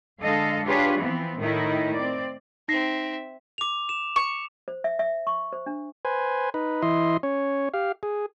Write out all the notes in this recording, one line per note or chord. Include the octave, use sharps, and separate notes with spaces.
D3 G#3 A4 D#5 F5
D4 F4 G4 G#4 B4 C#5
E3 F3 B3 C4
A2 D#3 A3 D#4 E4
C4 D5
C4 D#4 E5 A#6 C7
D6 F7
E7
C#6
C5
E5
E5
C#6
C5
D4
B4 C5 G#5
D#4 B4
E3 E4 D#5 C6
C#4 C#5
G4 F5
G#4